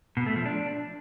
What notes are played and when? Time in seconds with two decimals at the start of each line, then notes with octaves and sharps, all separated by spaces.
0.17 B2
0.26 A3
0.36 F3
0.46 D4